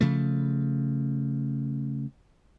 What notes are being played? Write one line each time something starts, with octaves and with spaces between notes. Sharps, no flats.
C#3 F3 A3